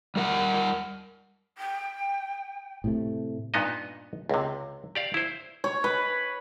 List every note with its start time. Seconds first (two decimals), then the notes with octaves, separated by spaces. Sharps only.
0.16 G3 A#4 F#5
1.58 G5
2.84 A2 C3 A3
3.54 G2 A#2 B3 D#4 D#5
4.29 C#2 C3
4.95 G4 D5 F5
5.14 E4 C5
5.64 C#5
5.84 B4